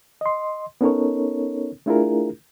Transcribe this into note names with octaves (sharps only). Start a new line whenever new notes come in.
D#5 C6
B3 C#4 D#4 A4 A#4 C#5
A3 D4 E4 F4 G#4 A#4